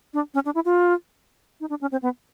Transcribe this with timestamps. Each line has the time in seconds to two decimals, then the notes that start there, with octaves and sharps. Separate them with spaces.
0.14 D4
0.34 C#4
0.45 D4
0.55 E4
0.65 F4
1.60 D#4
1.70 D4
1.81 C#4
1.92 C4
2.02 B3